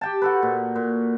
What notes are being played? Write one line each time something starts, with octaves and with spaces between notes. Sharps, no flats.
G4 G5 A5
F#4 A4 B4
A#2
A#2